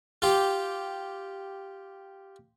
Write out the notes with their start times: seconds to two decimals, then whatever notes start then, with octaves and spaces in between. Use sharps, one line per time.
0.22 F4 G4